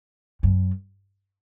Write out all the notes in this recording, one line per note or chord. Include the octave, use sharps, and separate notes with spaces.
F#2